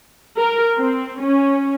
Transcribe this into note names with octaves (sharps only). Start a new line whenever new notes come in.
A#4
C4
C#4